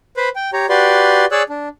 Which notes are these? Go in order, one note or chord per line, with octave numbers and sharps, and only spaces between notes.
B4 C5 B5
G5
G4 C#5 A#5
F#4 G4 B4 D5 C6
G#4 C#5 D5 E6 F#6
D4